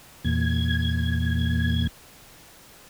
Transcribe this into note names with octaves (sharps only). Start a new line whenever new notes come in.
E2 A#2 G#6